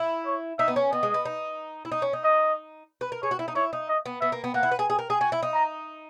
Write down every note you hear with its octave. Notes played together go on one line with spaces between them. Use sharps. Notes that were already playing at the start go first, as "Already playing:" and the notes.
Already playing: E4
C#5
D#4 E5
B3
C#4
B3 D#5
G#3
B3
D#4
E4
D#4
C#4
D#4
D#5
B4
A#4
G#4 C#5
F#4
E4
D#4
E4 C#5
D#4
D#5
B3
B3 E5
A#3
B3
A#3 F#5
E4
B4
G#4
G#4
A#4
G#4
F#4 G#5
E4
D#4
A#5